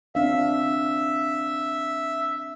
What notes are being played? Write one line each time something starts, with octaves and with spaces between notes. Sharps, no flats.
C4 D4 E5 F5